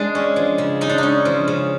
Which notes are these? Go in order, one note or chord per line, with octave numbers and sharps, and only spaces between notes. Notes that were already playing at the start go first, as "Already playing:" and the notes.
Already playing: G#3 D4
C#4
F3
C#3
G#3 D#4
D4
C#4 D#4
F3
C#3